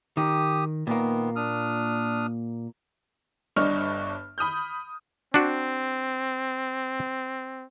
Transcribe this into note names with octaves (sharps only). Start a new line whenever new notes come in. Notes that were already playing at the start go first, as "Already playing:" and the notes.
D#3 G4 D#6
A#2 D#3 A#3 B3
D4 D#6 F6
G1 G2 D4 D#5 C#6 F6
B5 D#6 F6 G6
C4 D4 F#4